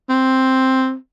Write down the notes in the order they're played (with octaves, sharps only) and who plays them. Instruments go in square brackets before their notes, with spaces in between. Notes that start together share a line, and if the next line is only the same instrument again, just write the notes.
[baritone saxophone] C4